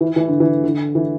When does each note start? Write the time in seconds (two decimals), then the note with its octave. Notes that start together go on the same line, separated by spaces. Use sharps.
0.01 E3
0.16 E3
0.28 D3
0.40 E3
0.63 D3
0.95 E3